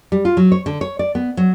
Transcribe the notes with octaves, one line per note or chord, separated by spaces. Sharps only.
G3
F4
F#3
C#5
D3
C#5
D5
B3
F#3